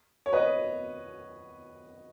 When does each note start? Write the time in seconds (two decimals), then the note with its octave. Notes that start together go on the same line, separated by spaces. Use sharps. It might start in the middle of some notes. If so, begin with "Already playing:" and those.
0.26 C#5
0.33 B4 D#5